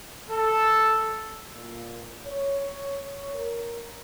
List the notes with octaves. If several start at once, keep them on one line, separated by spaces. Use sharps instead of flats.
A4
A#2
C#5
A#4